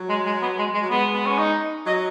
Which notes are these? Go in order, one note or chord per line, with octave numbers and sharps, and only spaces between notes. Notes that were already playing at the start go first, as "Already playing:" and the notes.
Already playing: F#3
G#3
G#3
B3
G#3
G#3
F#3
G#3 B3
B3
C#4
D#4
F#3 D#5